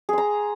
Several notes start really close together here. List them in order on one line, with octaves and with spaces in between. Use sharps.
G#4 C6 A#5